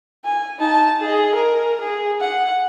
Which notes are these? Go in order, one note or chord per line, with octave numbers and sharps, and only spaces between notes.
G#5
D#4 A5
G#4 D#5
A#4
G#4
F#5